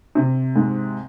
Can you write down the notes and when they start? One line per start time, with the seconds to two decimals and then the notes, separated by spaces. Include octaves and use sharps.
0.15 C3
0.56 G#2